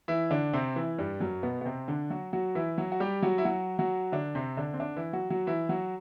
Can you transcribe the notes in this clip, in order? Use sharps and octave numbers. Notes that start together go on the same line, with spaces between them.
E3 E4
D3 D4
C3 C4
E3 E4
G2 G3
F#2 F#3
B2 B3
B3
C3 C4
D3 D4
F#3 F#4
F#3 F#4
E3 E4
F#3 F#4
F#4
G3 G4
F#3 F#4
E4
F#3 F#4
F#3 F#4
D3 D4
C3 C4
D3 D4
C4
D3 D4
E3 E4
F#3 F#4
F#3 F#4
E3 E4
F#3 F#4